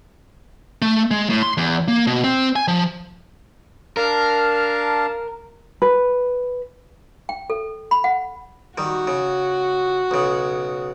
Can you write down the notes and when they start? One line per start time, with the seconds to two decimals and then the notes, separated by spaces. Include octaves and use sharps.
0.82 A3
1.11 G#3
1.30 A2
1.43 C6
1.57 E2
1.88 A#3
2.07 B2
2.24 C4
2.56 G#5
2.68 F3
3.97 D4 A#4 F5 A5
5.82 B4
7.29 G5
7.50 A4
7.91 B5
8.04 F#5
8.78 D#3 G3 F#4
9.07 C#3
10.11 B1 C#3